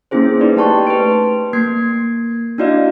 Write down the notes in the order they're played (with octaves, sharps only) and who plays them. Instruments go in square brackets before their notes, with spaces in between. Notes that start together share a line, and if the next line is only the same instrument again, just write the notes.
[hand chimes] A#3 B3 C#4 E4 G#4 C5
D#4 B4 D5 C6
A3 G4 G5 A5 C6 C#6
B4 D7
A#3 G#6 C7
D4 E4 F#4 D5 D#5 F5